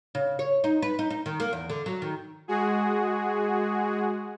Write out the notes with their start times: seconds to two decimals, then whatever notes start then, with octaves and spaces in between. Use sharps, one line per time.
0.15 C#3
0.39 C#5
0.64 D#4
0.82 B4
0.99 D#4
1.10 D#4
1.26 D#3
1.40 A#3
1.53 E2
1.70 D3
1.86 F#3
2.02 D#3
2.48 G#3 F#4 G#4